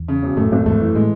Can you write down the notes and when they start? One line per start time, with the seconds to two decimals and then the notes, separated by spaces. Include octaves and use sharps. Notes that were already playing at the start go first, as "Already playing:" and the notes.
Already playing: E2
0.08 C#3
0.23 E1
0.37 F#2 A2 A3
0.51 G#1 F#2 A2
0.66 E2 G#2 A3
0.80 F#2 E3
0.95 A2 G#3